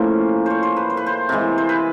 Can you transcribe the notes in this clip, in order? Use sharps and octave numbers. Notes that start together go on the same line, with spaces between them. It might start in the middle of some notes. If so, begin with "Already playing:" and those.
Already playing: A2 F3 A#3 C#4 C5
C5 C#5
C5
B4
C5
B4
C5
C3 E3 G#3
C5
B4